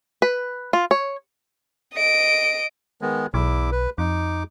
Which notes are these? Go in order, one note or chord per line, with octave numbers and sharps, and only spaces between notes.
B4
F4
C#5
D#5 D7
D#3 G#3 B3
B1 E2 E4 D6
B4
F2 D#4 D6